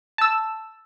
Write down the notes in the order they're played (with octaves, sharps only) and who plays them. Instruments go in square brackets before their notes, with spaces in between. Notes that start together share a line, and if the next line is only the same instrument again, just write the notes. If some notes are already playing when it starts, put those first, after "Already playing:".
[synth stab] A5 E6